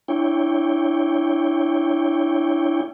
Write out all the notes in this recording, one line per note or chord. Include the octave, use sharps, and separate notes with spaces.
D4 E4 C#5 G5